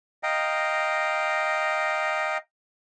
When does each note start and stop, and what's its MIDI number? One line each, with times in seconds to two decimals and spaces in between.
0.23 2.38 75
0.23 2.38 77
0.23 2.38 79
0.23 2.38 82